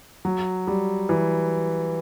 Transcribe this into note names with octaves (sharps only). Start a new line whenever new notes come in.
F#3
G3
E3